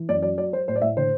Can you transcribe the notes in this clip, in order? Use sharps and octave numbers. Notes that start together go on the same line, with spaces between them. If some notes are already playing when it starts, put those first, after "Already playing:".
Already playing: E3
F#2 D5
F#3 D5
F#3 D5
F#3 C5
A2 C5
D5
A2 E5
D3 C5